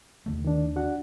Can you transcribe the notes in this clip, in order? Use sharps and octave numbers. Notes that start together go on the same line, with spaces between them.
D#2 D3 A3
D#3 D4
D4 F#4 F#5